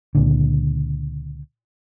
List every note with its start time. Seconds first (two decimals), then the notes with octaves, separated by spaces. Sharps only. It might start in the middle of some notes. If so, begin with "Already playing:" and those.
0.15 C#2 A#2 D3